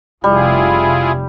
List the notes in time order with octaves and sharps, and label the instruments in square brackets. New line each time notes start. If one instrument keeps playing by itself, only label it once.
[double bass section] F1 [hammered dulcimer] G3 [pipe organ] E4 F4 G#4